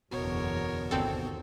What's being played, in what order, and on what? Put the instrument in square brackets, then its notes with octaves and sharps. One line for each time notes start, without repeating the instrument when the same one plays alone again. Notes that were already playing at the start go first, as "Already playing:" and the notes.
[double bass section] F#1 E2 D3 [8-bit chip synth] B2 B3 F#4 [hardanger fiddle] A#4 C#5
[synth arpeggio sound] G1 C4 A4 [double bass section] D#2